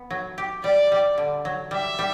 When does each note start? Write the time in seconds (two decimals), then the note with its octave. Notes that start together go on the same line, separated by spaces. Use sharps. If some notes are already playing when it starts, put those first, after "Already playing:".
Already playing: B3
0.10 F#3
0.38 G4
0.64 G3 D5
0.92 G3
1.18 D3
1.45 F#3
1.71 G3 E5
1.99 G3